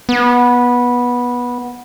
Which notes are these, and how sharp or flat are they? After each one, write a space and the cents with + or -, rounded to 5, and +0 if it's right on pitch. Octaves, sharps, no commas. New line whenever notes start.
B3 -15